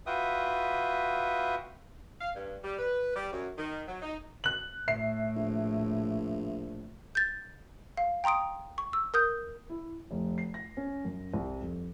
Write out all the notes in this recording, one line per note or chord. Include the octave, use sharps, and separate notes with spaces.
F4 F#4 B4 E5 G5 D#6
F5
G2
G3
B4
G3
F#2
D#3
F#3
D#4
F#6 F#7
A2 E5 C7
A#1
G6 A6
F5
G5 A#5 C6 D#6 D7
C#6
E6
A#4 D#6 G6
E4
F1
C7
A#6
C#4
F#2
C2
F2